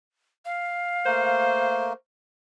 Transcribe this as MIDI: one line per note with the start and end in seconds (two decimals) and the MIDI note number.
0.45 1.76 77
1.06 1.93 57
1.06 1.93 58
1.06 1.93 70
1.06 1.93 72